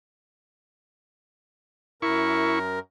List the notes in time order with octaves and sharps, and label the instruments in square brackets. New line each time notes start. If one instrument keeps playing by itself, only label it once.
[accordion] F#2 A#4 [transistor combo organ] E4 C#6